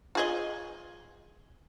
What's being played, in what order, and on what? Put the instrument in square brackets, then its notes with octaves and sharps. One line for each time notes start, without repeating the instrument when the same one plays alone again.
[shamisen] F4 G#4 D#5